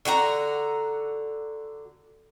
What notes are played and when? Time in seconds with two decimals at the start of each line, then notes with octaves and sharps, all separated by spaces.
0.05 D3 F#4 G4 A#5